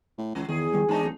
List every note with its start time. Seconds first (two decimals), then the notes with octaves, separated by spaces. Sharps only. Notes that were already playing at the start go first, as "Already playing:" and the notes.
0.18 A2
0.35 C#2 D#3
0.49 E2 D#3 G#4
0.73 D#3 G3
0.88 E2 G#2 C4 D4 D#4 A5
1.02 D1